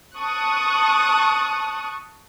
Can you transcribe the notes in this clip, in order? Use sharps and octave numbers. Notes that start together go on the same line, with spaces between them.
A5 C#6 D#6 F#6